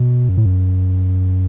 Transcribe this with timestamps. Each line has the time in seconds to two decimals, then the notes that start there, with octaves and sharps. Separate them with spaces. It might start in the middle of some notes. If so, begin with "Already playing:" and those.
Already playing: B2
0.29 F#2
0.37 A2
0.46 F#2